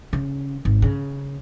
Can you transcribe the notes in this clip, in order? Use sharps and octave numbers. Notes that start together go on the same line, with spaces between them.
C#3
G#1
C#3